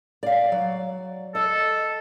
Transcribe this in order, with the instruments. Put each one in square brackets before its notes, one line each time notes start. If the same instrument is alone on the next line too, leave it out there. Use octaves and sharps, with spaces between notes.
[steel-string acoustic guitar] D5 F5
F#3
[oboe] A4 [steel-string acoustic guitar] D#5